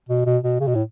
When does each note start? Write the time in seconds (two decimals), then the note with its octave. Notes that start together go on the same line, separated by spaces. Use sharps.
0.09 B2
0.26 B2
0.43 B2
0.60 C#3
0.67 B2
0.75 A2